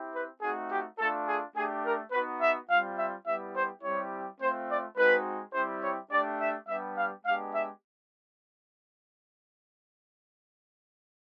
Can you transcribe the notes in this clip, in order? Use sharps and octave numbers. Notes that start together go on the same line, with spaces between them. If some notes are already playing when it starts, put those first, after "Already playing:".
Already playing: C4 E4 G4
B4
A3 C4 D#4 F#4 G#4
G4
A3 D4 F4 A4
G#4
A3 D4 G4 G#4
A#4
B3 D#4 F#4 B4
E5
G3 C4 F4 F5
E5
G3 B3 E4 G4 E5
C5
G3 C4 E4 G4 C#5
A3 C4 F4 C5
D5
G#3 C4 D#4 F#4 B4
G3 C4 E4 G4 C5
C#5
A3 D4 G4 D5
E5
G3 B3 D4 G4 E5
F5
G#3 B3 D4 G4 F5
E5